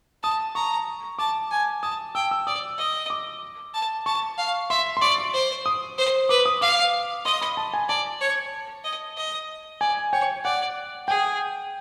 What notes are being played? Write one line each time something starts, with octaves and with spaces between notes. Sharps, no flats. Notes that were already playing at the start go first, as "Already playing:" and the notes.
A5 D#6
A#5 C#6
A5 D6
G#5
A5 D#6
G5 E6
E6
D5 D#6
D#5
D6
A5
A5 C#6
F5
E5 C6
C6
D5 C#6
C#6
C5
D#6
C5
B4 D6
D#6
F5 D6
D#5 C6
B5
A5
G#5
D5 A5
C#5
D#5
D#5
D5 G#5
C#5 G5
D5 F#5
G#4 G5